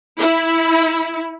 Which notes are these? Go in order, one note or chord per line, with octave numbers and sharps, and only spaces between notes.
E4